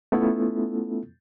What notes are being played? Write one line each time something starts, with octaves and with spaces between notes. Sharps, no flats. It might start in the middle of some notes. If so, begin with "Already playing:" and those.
A3 B3 C#4 E4 F4 A4